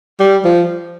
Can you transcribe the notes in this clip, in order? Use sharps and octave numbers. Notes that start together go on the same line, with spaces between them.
G3
F3